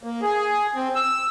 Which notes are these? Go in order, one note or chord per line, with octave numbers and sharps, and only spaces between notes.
A#3
G#4
C4
E6